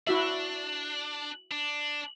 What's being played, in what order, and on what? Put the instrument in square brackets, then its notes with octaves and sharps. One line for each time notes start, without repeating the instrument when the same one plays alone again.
[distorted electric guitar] D4 [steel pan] E4 F#4 E5
[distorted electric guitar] D4